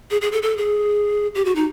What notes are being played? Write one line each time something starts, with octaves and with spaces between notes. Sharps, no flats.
G#4
G#4
A4
A4
G#4
G4
F#4
D#4